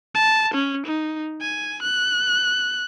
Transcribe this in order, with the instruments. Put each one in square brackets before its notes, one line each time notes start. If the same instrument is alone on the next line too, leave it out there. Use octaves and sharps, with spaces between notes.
[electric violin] A5
C#4
D#4
G#5
F#6